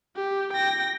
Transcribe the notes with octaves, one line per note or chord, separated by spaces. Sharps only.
G4
G5 A#6